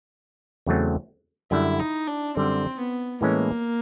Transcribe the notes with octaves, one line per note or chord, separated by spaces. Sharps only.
E2 C#3 F#3 A3 C4
F#2 D3 G3 E4
D#4
D4
F#2 D3 G3 C4
B3
A2 E3 G#3 A#3 C#4